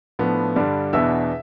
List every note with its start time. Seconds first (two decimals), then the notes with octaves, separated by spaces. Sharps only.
0.19 A2 F3 B3 D4
0.56 G2 D3 G3 D4
0.93 E2 B2 B3 D4 E5 E6